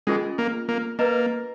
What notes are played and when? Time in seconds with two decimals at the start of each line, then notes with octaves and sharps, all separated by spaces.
0.07 G#3 C#4 F4 G#4 D#5 G#5
0.38 A#3
0.69 A#3
0.99 A#3 B4 D#5 A#5